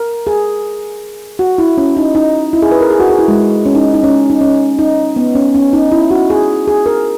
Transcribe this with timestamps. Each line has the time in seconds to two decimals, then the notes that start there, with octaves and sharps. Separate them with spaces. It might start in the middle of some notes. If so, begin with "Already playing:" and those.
Already playing: A#4
0.27 G#4
1.39 F#4
1.58 E4
1.78 C#4
1.97 D#4
2.15 D#4
2.53 E4
2.62 G#4
2.72 B4
2.81 A#4
2.90 G#4
3.00 F#4
3.09 G#4
3.19 E4
3.28 G#3
3.66 C#4
3.75 D#4
3.94 D#4
4.04 C#4
4.30 D#4
4.41 C#4
4.79 D#4
5.16 B3
5.35 C#4
5.55 C#4
5.73 D#4
5.92 E4
6.11 F#4
6.30 G#4
6.67 G#4
6.86 A#4